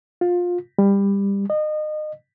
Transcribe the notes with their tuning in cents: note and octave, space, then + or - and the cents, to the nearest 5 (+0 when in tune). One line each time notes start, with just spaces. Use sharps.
F4 +20
G3 +20
D#5 -30